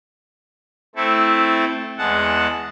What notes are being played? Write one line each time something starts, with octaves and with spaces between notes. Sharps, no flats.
A3 C4 E4 A4
E2 G#3 F#5 A5